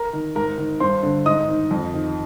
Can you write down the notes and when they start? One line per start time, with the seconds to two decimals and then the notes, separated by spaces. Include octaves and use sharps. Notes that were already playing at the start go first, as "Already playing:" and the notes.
Already playing: A#4 A#5
0.13 D#3
0.35 G#2 A#4 A#5
0.58 D#3
0.80 G2 C5 C6
1.03 D3
1.26 G#2 D#5 D#6
1.48 D#3
1.71 F2
1.94 D#3